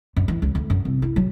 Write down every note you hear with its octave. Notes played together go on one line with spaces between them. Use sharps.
F#2
E3
C#2
D2
F#2
C2
E4
F#3